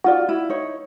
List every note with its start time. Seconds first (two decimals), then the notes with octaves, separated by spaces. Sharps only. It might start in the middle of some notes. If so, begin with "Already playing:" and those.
0.04 D#4 F4 F#4 D5
0.29 E4
0.50 D#4 C#5